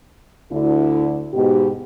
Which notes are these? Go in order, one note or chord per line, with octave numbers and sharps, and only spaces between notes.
D2 D3 E4
G#2 B2 G4